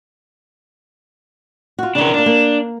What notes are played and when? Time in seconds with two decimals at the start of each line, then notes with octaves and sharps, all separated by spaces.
1.79 F4 F#4
1.95 C#3 E3 D4 A#4
2.14 A#3 D4 F4
2.26 A#3